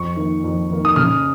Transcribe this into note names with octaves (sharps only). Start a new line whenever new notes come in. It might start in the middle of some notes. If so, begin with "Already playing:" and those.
Already playing: F2 C#6
D#3 A#3
F2
D#3 A#3
D#6
C#3 F6